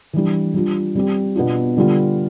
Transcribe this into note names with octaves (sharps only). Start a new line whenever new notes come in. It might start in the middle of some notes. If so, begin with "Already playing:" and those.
E3 G3 D4
G3 D4 F4
G3 C4 G4
B2 B3 D4 F4
D3 G3 B3 F4